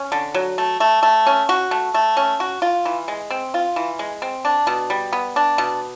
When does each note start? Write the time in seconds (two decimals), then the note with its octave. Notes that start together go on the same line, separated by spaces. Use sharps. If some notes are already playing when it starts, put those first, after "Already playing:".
Already playing: C#4
0.12 D3
0.34 F#3
0.58 A3
0.80 A3
1.03 A3
1.27 C#4
1.49 F#4
1.71 A3
1.94 A3
2.17 C#4
2.40 F#4
2.62 F4
2.85 E3
3.08 G#3
3.30 C4
3.54 F4
3.76 E3
3.99 G#3
4.22 C4
4.45 D4
4.67 B2
4.90 G3
5.13 B3
5.36 D4
5.58 B2